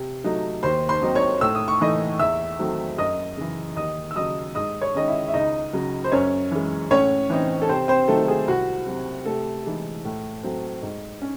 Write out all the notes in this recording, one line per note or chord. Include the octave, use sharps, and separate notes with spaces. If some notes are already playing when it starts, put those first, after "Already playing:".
Already playing: C3
F#3 A3 D#4
D#2 C5 C6
C5 C6
D#3 F#3 C4 D#4
C#5 C#6
A2 E6
D#6
C#6
E3 A3 D#4 D#5 D#6
E2 E5 E6
D#3 F#3 A3 C4
F#2 D#5 D#6
C#3 E3
D#2 D#5 D#6
E6
C#3 F#3 D#5 D#6
G#2 D#5 D#6
C#5 C#6
D#3 G#3 C#4 D#5
E4 E5
E5
C#2 D#4 D#5
C#3 F#3
C5
F#2 C#4 C#5
E3 G#3
A2 C#4 C#5
E3 C4 D#4
A4
C3 C4 C5
C4 C5
D#3 F#3 A3 A4
G#4
C2 F#4
C3 F#3 C4
C3 A3 A4
E3 G#3 D#4
A2
F#3 A3 C4
G#2
C#4